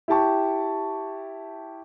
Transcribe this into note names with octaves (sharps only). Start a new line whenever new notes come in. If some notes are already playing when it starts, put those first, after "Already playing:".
E4 G4 G5 A5 C#6